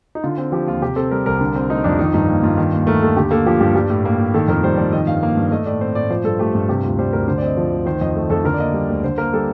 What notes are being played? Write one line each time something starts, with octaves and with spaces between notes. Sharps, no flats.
D#4
D3 F4
C4 F4
F3 G4
D#2 F4
C3 G4
C4 A4
G3 A#4
C2 A#4
D3
C4
A3 D#4
F2 D4
D#3 D#4
G2 D#4
A#3
G2 F4
D#3
D#2
A3 A#4
D#2 A4
D3 G4
A#3 A4
F3 G4
G2 G4
G3 G4
A2
A#3
A2
D#3 A4
F2 A#4
G3 C5
F2 D5
D#3 D#5
G2 F5
A#3
G2
A3 D#5
A2 D5
C4 C5
A2 D5
F3 C5
G2 A4
A3 G4
G2 F4
C3 G4
D2 F4
G3 C5
D2 A#4
D3 C5
D5
C4 D#5
F3
D2
D#3 C5
F2 D#5
A3
F2 A4
D3 A#4
D5
A#3 D#5
G3
D2
D3 C5
A#3 A#4
G3 A4